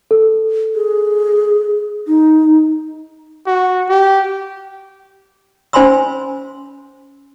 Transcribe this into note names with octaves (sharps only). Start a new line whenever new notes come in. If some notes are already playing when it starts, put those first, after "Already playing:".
A4
G#4
D#4
F#4
G4
C#4 C5 G#5 B5 C6 E6